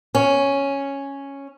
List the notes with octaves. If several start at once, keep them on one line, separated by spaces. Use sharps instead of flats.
C#4